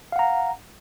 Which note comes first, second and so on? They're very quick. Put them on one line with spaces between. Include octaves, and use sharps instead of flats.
F5 F#5 A#5